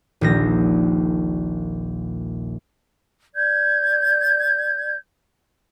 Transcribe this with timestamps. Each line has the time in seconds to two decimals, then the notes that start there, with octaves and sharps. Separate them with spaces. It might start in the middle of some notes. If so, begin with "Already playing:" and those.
0.21 D#1 A#1 A#6
3.36 D5 G6 G#6